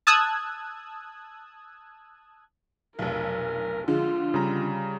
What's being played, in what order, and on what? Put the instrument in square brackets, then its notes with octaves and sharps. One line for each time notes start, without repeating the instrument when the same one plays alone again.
[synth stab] A5 D#6 E6 F#6 G#6
[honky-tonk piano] F1 B1 [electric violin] A#4
[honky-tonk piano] D3 F3 G#3 [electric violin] F4
[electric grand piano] C#3 G3 A#5